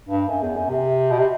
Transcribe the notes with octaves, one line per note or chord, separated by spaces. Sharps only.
G2
F#2
E2
F#2
C3
B2
C3